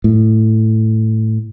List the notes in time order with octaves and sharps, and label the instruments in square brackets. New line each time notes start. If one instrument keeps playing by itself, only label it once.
[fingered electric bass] A2